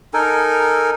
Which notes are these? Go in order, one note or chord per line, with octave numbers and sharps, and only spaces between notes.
D#4 A4 A#4 G#5